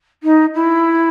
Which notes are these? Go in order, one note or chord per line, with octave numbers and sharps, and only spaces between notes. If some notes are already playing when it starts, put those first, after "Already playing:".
D#4
E4